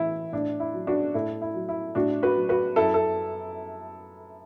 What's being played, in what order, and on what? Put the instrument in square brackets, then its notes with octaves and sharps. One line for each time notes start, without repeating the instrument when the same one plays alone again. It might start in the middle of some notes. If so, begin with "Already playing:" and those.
Already playing: [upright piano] A2 E3 E4
A2 D4
E4
F#3
D4 F#4
A2 E4 A4
E4
F#3
E4
A2 D4 F#4
F#4 B4
F#3
F#4 B4
F#2 E4 A4
A4